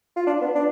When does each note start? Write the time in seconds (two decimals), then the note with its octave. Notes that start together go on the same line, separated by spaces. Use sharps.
0.17 F4
0.27 D4
0.41 B3
0.55 D4